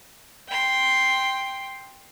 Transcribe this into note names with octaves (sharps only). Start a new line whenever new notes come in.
G5 C6